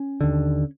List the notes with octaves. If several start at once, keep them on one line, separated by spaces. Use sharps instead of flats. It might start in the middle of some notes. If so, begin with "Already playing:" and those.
Already playing: C#4
D#2 D3